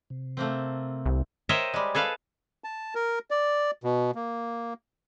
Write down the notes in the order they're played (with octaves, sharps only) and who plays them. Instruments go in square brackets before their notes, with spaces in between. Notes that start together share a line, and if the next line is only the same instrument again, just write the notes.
[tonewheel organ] C3
[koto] A3 A#3 C4
[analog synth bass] C2
[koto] A#4 C5 C#5 D#5 E5 G5
G3 G#3
G#4 A4 B4 F5
[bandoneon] A5
A#4
D5
B2
A#3